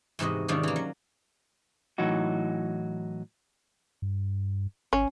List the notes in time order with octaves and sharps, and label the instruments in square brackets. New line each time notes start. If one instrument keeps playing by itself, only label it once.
[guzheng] E2 G#2 C3 F#4 D#5
C3 D#3 F3 G#3 C#4 D4
E3 A#3
F#3
[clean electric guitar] A2 E3 F#3 D#4 F#4
[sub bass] G2
[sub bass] G#1 [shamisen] C#4